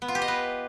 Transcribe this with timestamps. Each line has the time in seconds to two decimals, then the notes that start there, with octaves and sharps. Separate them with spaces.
0.02 B3
0.08 F4
0.15 G4
0.22 D#5
0.28 B4